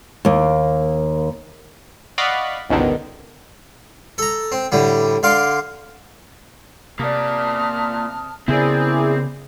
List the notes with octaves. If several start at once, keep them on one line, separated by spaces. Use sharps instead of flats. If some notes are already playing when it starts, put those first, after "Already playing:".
D#2 A#3
D5 D#5 F5 F#5 B5 C#6
G1 C#2 G#2 B2 D3 D#3
A4 A#5
C4
A2 D3 G3
D3 F5 C6 D6
C3 A#3 D5 A5 D#6 F6
C#3 B3 C4 E4 G#4 A#4 D5